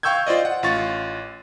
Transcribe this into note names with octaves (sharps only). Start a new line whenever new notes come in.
F5 G5 C#6 E6 G6 G#6
F4 C5 D5 D#5
F#5
A1 F4 C#6 A6